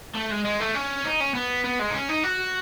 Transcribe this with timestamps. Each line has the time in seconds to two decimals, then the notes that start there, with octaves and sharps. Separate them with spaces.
0.15 A3
0.30 G#3
0.45 G#3
0.60 A3
0.75 C#4
1.04 D#4
1.20 C#4
1.35 B3
1.64 B3
1.80 G#3
1.90 D#4
1.94 C#4
2.09 D#4
2.23 F#4